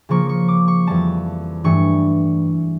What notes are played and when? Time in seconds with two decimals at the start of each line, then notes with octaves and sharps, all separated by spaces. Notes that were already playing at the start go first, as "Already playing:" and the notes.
0.09 C#3 F3 A#3 C#6
0.29 C#6
0.48 D6
0.68 C#6
0.87 F2 E3 G3 A5
1.64 G2 E3 A3 C#6